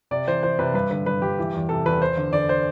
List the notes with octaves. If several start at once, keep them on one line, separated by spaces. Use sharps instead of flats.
C3 D5
E3 C5
E3 C5
C3 B4
G2 B4
D3 B4
G2 B4
G2 G4
E3
E2
C3 A4
E2 B4
E2 C5
D3
D3 D5
C5